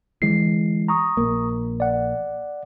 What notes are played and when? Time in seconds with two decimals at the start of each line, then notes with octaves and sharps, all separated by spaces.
0.22 D3 E3 G#3 C7
0.88 A#5 C#6 D#6
1.17 A#1 A#3
1.80 D5 F#5